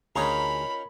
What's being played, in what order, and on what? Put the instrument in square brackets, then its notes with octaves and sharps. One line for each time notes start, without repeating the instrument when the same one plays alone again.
[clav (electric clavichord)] D2 G#4 A#5 [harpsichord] C#4 D#4 F4 [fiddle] A#4 B5